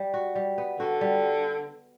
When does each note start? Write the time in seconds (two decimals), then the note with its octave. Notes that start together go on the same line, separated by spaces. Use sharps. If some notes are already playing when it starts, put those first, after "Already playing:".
Already playing: G3
0.14 F#4
0.35 G3
0.58 B3
0.79 D3 F#4
1.01 G3